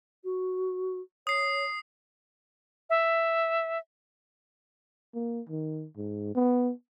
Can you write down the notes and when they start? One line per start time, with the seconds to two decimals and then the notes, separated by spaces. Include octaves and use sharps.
0.24 F#4
1.27 C#5 D#6 C7
2.90 E5
5.14 A#3
5.49 D#3
5.97 G#2
6.35 B3